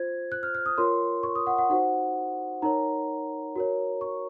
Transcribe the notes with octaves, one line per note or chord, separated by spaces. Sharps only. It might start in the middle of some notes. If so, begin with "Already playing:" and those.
Already playing: F4 C5 G#6
F#6
F6
F6
D#6
F4 A#4 C#5 C6
C#6
D#6
F#5
F#5
D#4 F#4 C5 F#5
D#4 A#4 C#5 A#5
F#4 A#4 C#5
C#6